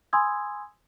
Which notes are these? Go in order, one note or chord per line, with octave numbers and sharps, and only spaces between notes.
G#5 B5 C6 D#6 E6 G#6